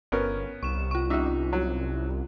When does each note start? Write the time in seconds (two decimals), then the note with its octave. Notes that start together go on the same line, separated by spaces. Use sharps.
0.12 G1 B3 C#4 A#4
0.63 C2 C#6 E7
0.91 F4 C#6
1.10 C#4 D#4 F4 E5
1.53 F#3